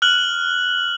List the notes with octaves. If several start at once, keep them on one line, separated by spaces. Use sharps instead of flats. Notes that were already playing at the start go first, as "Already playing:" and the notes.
F6 F#6 F#7